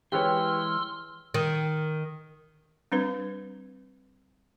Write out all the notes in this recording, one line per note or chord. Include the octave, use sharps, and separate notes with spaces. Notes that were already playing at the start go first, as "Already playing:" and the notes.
E3 G#3 G4 B4 C#5 C6 E6 F6
D#3
G3 C4 D4 B4